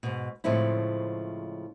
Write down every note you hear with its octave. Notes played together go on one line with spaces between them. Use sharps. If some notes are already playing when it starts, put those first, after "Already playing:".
G#2 B2
A2 C#3 F3 G#3 C4 E4